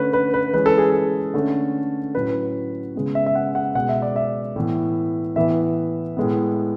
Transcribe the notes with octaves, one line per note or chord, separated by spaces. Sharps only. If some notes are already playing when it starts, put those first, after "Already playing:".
Already playing: D3 A3 C#4 B4
B4
B4
E3 G#3 C#4 B4
A4
G#4
A4
D3 A3 C#4
A2 F#3 C#4 B4
C#3 G#3 B3
E5
E5
F#5
F#5
B2 G#3 B3 F#5
E5
D5
E5
A2 E3 B3
A2 E3 B3 E5
A2 G#3 B3